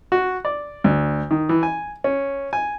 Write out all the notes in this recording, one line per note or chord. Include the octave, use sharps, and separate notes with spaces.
F#4
D5
D2
D#3
E3
G#5
C#4
G#5